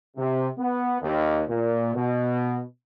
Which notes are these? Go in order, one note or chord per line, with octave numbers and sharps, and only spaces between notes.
C3
B3
D#2
A#2
B2